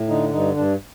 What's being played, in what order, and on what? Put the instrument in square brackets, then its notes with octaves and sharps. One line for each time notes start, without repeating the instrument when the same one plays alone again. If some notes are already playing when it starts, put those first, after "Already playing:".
Already playing: [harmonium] A2
D3 D#4
G2 D#4
G2 D4